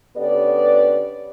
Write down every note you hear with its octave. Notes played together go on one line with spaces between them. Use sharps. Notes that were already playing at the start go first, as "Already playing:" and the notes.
D3 B3 C#4 G4 D5